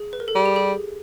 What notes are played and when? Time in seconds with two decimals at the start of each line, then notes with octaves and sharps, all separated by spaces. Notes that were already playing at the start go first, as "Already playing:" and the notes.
Already playing: G#4
0.13 B4
0.20 A#4
0.28 A4
0.35 G3 G#4
0.46 G4
0.56 G#4